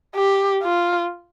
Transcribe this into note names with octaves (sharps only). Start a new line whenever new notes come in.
G4
F4